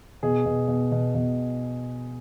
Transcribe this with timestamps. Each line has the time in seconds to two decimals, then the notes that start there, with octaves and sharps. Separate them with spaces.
0.23 B2 G#4
0.46 B2
0.68 B2
0.92 B2
1.15 B2